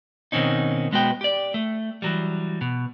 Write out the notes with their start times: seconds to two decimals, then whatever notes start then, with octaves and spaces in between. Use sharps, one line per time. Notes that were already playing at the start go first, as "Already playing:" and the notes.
0.32 B2 D#3 C4 C#4 D#4
0.92 B1 G#3 B3 F#4 B4 G5
1.21 G4 D5
1.54 A3
2.02 E3 F#3 G3
2.61 B2